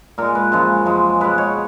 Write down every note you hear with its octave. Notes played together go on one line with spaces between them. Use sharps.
A#2 G#3 A#4
B4
F#2 C#3 F3 G#3
F#2 F3 G#3
B2 G#3 B4
C#5